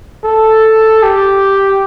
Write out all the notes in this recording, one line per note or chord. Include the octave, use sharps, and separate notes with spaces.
A4
G4